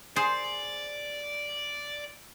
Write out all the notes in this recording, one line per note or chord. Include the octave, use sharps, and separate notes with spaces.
G#4 C5 D5